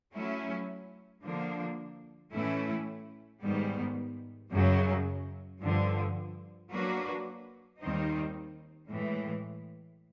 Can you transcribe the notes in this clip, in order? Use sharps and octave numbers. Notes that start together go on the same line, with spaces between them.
F#3 A3 C#4 E4
D3 F3 A#3 D4
A2 E3 A3 C#4 E4
G#2 D#3 G3 B3
F#2 C#3 F#3
G2 D3 F3
F#3 A#3 D4 F#4 B4
D#2 D#3 G3 C4 D#4
A2 E3 G#3